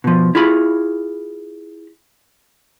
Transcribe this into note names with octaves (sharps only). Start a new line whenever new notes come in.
B2 F3
E4 F4 G#4 B5